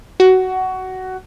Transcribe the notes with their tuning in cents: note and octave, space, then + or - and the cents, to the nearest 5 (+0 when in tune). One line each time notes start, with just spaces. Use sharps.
F#4 +15